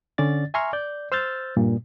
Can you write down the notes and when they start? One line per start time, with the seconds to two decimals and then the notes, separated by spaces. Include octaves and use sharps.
0.18 D3 C#4 D5 A6
0.54 E5 G#5 A#5 C6 C#6 F6
0.73 D5 G6
1.12 C5 E6 F6 G6 A6
1.57 G2 A#2